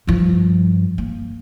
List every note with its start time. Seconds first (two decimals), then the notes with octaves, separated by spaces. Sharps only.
0.07 G2 F3
0.98 A#3